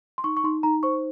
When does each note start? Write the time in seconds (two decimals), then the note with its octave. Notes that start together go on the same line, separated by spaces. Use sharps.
0.18 C6
0.24 D#4 C#6
0.37 C#6
0.44 D#4 C6
0.63 D#4 A#5
0.83 C5 C#6